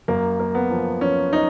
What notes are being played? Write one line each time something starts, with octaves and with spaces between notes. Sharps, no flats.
F#2 A#3
A#3
B3
F3
F3 C#4
D#4